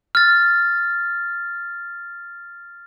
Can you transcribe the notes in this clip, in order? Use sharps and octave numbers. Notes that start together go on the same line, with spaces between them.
F6 A6